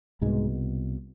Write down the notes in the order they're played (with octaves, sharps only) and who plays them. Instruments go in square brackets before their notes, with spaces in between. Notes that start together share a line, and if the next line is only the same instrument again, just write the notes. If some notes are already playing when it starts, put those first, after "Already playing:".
[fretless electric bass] C2 G#2 B2 G#3